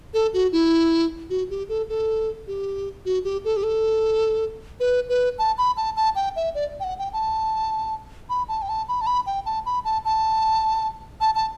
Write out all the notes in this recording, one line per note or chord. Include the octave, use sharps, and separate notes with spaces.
A4
F#4
E4
F#4
G4
A4
A4
G4
F#4
G4
A4
G4
A4
B4
B4
A5
B5
A5
A5
G5
E5
D5
G5
F#5
G5
A5
B5
A5
G5
A5
B5
A5
B5
G5
A5
B5
A5
A5
A5
A5